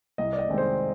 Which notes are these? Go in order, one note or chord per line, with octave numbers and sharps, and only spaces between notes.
C2 D#5
D5
D#5
C3 D#3 G#3 C4
C5